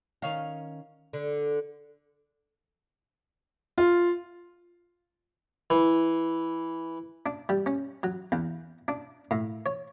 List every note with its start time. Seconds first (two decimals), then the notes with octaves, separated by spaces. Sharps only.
0.22 D#3 C#4 F5
1.13 D3
3.78 F4
5.70 E3
7.26 D4
7.49 G3
7.66 C#4
8.03 F#3
8.32 E2
8.88 D4
9.31 A2
9.66 C#5